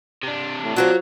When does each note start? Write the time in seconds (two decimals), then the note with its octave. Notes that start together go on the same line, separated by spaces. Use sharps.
0.23 C3 D4
0.64 A2
0.76 F#3 F4 F#4 C5